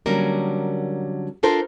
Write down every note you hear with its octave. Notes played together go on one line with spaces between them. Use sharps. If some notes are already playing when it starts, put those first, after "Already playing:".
D3 F#3 G3 A#3 C#4 A#4
D4 F4 A4 A#4 C5